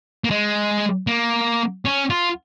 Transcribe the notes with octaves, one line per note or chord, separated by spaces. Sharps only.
A#3
G#3
A#3
C#4
F4